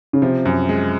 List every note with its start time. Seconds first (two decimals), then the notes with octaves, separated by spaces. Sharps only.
0.13 C#3
0.22 C3 F3
0.45 F#2
0.69 G#3